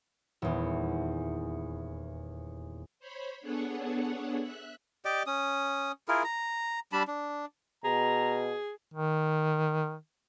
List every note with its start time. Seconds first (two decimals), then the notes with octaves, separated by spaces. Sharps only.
0.42 D#1 E2
3.00 C5 C#5 B5
3.41 B3 D4 G#4 A4 C#5 F#5
4.41 E5 F#6
5.05 G4 D5 D#5 D6
5.27 C#4 D#6
6.08 E4 F4 G#4 A#4
6.24 A#5
6.92 G3 D4 A5 B5
7.08 D4
7.84 B2 G#4 A#5
8.94 D#3